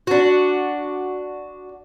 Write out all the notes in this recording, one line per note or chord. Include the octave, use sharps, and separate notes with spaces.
D4 F#4